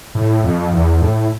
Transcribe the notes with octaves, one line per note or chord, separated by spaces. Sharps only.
A2
F2
E2
A2